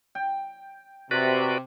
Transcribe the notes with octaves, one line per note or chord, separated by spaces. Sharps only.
G5
C3 F#4 B4 D5